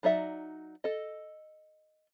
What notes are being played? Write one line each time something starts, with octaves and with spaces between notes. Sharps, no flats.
F#3 D#4 D5 E5 F#5
A4 D#5